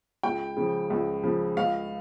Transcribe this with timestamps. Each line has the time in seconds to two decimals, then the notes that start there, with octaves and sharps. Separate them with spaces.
0.23 C#2 G5
0.57 C#3 F3
0.90 C#2
1.24 C#3 F3
1.57 C#2 F5